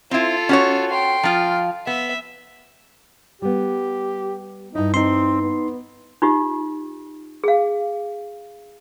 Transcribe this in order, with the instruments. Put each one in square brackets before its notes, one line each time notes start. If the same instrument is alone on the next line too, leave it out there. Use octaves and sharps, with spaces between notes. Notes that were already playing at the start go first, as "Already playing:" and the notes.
[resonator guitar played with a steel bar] C4 E4 [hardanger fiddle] F4 A4
[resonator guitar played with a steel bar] C#4 F#4 C#5
[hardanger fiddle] G5 C6
[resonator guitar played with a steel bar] F3 F4
[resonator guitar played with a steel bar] B3 [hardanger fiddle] E5
[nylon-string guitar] G3 B3 [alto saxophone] G4
[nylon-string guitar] G2 E4 [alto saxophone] D#4
[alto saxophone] C4 [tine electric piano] D#4 C6
[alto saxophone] B3
[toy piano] D#4 F4 G4
G#4 F5